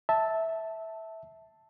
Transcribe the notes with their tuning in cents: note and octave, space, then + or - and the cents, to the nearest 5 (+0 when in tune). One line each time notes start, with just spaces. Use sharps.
E5 -10 A5 +0